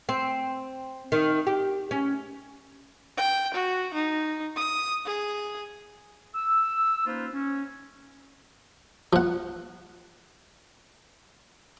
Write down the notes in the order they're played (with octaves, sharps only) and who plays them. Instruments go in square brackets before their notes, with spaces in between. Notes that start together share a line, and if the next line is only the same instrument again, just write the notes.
[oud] C4
D#3
G4
C#4
[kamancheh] G5
F#4
D#4
D#6
G#4
[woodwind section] E6
A#3 C#4 D#4 F4 B4 C5
C#4
[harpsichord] F3 F#5